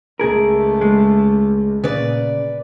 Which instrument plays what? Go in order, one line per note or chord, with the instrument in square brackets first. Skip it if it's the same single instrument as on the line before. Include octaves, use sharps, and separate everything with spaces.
[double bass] C#2 A3 [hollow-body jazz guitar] G#4 A#4
[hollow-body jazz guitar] G#3
[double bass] A#2 [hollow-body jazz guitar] C#3 [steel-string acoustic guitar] B4 D5